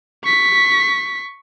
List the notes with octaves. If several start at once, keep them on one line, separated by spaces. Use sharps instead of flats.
C#6 B6